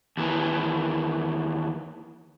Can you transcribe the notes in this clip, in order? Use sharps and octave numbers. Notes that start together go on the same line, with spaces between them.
D#2 E3